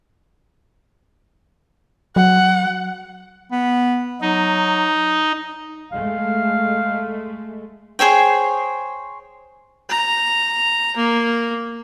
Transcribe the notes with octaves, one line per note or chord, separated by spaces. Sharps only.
F#3 F#5
B3
F#3 D#4
G#3 A3 F5
G#4 C5 C#5 G5
A#5
A#3